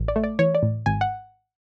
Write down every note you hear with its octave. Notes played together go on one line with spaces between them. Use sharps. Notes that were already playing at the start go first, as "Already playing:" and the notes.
Already playing: A1
D5
A3
D5
E3 C#5
D5
A2
G#1 G#5
F#5